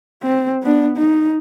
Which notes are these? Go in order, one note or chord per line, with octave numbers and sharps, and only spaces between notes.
C4
B3 D4
D#4